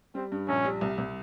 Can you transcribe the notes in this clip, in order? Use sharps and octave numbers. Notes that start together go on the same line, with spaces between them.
G3 C4
G2
A#1 C#4
G3
C2
C2